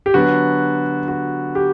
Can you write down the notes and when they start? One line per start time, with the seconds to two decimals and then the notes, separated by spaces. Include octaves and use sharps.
0.06 G4
0.14 D3 F#3 B3 F#4
1.08 F#4
1.55 G4